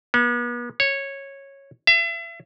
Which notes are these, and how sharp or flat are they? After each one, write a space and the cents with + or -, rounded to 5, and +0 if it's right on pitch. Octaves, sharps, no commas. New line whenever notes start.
B3 -40
C#5 -10
E5 +35